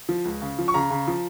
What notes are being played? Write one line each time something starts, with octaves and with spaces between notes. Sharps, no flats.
F3
C#2
C#3
F3
C#6
C#3 A#5
C#3
F3